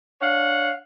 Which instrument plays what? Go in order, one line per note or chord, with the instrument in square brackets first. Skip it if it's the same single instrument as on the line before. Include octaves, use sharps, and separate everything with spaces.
[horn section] D4 C#5 F5 F#5